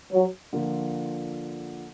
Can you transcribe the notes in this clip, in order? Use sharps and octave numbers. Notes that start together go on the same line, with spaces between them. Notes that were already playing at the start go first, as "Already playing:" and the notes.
F#3
D3 F3 A#3 F4